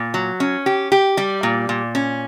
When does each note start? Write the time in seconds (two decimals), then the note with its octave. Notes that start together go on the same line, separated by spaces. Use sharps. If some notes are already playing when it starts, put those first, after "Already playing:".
Already playing: A#2
0.14 F#3
0.40 C#4
0.66 G4
0.92 G4
1.17 G3
1.43 A#2
1.69 A#2
1.95 C#4